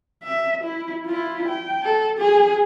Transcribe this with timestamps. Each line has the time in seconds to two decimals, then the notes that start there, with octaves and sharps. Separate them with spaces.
0.23 E5
0.64 E4
1.06 E4 F4
1.49 G5
1.83 A4
2.19 G#4